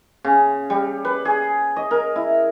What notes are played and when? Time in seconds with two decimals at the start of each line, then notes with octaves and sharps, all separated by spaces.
0.24 C#3
0.70 G3
1.05 B4
1.25 G#4
1.76 D#5
1.91 A#4
2.16 E4